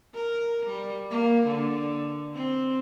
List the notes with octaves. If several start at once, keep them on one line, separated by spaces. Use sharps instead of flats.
A#4
G3
A#3
D3
C4